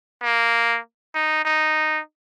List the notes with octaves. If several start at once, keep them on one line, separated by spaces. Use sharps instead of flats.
A#3
D#4
D#4